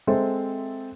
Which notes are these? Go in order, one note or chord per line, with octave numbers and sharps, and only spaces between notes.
G#3 C4 A4 C5 E5